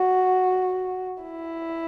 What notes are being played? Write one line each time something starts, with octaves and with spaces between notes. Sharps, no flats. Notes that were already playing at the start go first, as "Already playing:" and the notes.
Already playing: F#4
E4